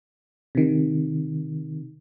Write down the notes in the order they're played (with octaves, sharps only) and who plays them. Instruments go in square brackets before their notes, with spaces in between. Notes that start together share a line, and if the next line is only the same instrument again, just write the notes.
[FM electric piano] C3 D#3